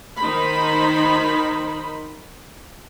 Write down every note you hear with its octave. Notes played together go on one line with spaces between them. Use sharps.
D#3 D#4 A#4 C5 B5